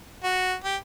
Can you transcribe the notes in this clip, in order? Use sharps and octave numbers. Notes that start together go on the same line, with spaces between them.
F#4
G4